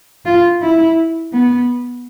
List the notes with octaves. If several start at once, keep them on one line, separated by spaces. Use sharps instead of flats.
F4
E4
B3